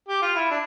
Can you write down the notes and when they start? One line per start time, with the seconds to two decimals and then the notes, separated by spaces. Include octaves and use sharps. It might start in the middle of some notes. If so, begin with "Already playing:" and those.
0.08 G4
0.22 F4
0.36 E4
0.51 D4